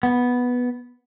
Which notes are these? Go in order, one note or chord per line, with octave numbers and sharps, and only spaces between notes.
B3